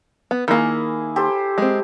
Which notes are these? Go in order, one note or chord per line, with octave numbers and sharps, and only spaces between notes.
B3
D#3 A#3 E4 G#4
G4 A4 C5
G#3 C4